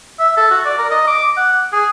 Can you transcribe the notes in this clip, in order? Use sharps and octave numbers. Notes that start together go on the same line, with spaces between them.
E5
A4
F#4
D5
A#4
D#5
D6
F#5
G#4